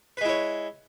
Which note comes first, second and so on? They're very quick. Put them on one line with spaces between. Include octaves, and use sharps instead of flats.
B4 G#3 E4 C#5